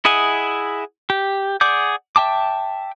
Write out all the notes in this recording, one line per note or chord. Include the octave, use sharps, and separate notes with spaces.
E4 G#4 D#5 F#5 G#5
G4
G#4 D5 F#5 D6 G6
E5 G5 A5 D6